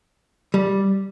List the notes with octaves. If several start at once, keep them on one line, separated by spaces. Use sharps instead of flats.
G3